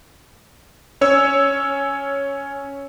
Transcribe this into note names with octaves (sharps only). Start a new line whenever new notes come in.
C#4 C#5 E6